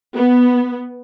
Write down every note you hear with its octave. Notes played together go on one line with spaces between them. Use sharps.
B3